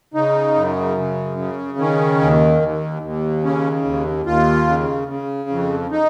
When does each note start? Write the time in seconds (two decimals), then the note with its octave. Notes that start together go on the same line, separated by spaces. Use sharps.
0.14 C#3 D#4
0.55 F#2
0.97 C#3
1.38 C#3
1.78 D#3 C#4
2.21 D#2
2.61 D#2
3.02 D#2
3.44 C#3 C#4
3.84 D#2
4.26 D#2 F4
4.67 C#3
5.08 C#3
5.50 F2
5.91 D#4